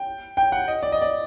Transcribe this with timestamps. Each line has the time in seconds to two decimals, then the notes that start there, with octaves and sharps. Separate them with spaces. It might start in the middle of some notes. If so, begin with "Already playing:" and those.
Already playing: G5
0.37 G5
0.52 F#5
0.68 D#5
0.83 D5
0.92 D#5
1.02 D5